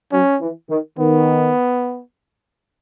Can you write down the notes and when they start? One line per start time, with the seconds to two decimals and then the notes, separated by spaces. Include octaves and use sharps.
0.12 F#3 C#4
0.41 E3
0.69 D#3
0.98 D#3 B3